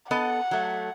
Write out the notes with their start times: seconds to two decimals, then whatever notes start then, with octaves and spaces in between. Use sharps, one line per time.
0.11 B3 A4 D#5 F#5
0.51 F#3 A3